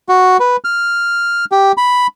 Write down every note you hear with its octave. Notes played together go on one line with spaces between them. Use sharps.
F#4
B4
F6
G4
B5